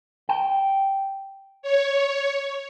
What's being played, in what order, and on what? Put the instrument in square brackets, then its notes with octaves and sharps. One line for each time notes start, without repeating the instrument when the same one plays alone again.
[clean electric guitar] G5
[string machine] C#5